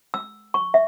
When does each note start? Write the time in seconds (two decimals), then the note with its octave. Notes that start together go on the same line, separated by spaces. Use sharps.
0.14 E6
0.54 C#6
0.74 E5